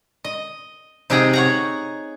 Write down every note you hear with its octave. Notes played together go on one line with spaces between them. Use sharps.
D#5
C3 D#4 G4 G#4 F#5 A#5
C#5 F#5 A#5